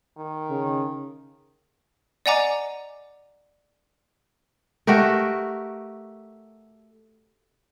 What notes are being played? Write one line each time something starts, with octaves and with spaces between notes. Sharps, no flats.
D#3
C#3
D5 D#5 F#5 G#5 A#5 D6
A3 F#4 G4 A#4